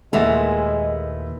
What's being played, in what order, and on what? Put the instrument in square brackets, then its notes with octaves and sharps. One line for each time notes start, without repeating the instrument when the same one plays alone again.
[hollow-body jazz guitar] D#2 [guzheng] A#2 E3 E4 [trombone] G#3 [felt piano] A3 E5 F#5